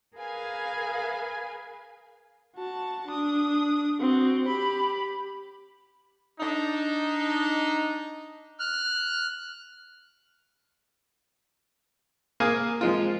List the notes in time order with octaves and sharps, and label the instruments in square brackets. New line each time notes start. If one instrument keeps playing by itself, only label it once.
[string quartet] G#4 A#4 B4 F5 G#5
[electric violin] F#4 A5
D4 D#6
C4 F#4
G4 B5
[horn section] D4 D#4
[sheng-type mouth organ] F6 F#6
[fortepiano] A#3 G#4 F5 G#5
F3 G#3 F4